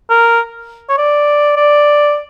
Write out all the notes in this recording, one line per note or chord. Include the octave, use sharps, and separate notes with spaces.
A#4
C#5
D5
D5